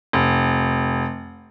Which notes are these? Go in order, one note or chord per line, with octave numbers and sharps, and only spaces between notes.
F1